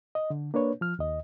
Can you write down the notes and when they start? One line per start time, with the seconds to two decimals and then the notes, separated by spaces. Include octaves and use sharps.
0.15 D#5
0.30 D3
0.54 A#3 D4 B4 C#5
0.81 F3 F6
0.99 D#2 D#5